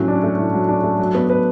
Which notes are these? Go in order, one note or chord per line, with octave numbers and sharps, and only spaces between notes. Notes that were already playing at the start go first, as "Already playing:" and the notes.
Already playing: A2 F#3 C#4
D4
A3
A2
F#3
D4
A3
F#3
B3
B4